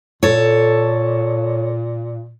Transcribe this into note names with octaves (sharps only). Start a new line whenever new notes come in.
A#2 A4 C#5